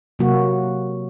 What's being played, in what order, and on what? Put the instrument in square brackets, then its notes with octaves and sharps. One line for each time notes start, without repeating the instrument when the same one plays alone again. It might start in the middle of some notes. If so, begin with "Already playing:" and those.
[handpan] C3 F#3 A#3 F#4